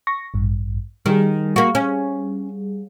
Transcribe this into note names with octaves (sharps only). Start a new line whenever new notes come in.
C#6 A#6
A1 G2
D#3 G3 G#4
A#3 F#4
C#4